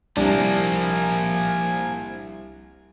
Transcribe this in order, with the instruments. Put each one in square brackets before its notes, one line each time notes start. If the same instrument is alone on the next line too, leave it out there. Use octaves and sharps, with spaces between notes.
[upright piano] C2 [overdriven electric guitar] F3 A#3 [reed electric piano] C4 D4 [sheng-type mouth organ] G#5